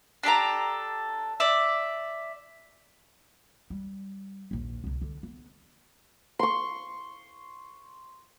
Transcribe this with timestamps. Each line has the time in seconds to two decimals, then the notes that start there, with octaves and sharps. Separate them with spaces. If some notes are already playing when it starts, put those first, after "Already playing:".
0.23 D4 G4 A4 A#5
1.40 D5 E5
3.70 G3
4.51 A#1 D#2
4.84 C2 C#3
5.01 D3
5.23 B3
6.39 C6 C#6